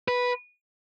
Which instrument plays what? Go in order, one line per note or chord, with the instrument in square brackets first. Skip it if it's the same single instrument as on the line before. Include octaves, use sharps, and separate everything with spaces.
[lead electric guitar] B4